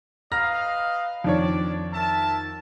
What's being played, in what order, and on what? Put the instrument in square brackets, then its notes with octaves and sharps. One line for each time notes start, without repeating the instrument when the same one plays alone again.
[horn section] B4 D#5 F5 [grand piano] A#5 F6 A#6
[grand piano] F2 D#3 C#5 [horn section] D4 D5
[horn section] A#4 E5 A5